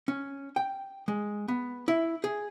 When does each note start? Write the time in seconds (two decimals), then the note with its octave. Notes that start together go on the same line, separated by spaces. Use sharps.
0.08 C#4
0.56 G5
1.08 G#3
1.48 B3
1.88 E4
2.24 G#4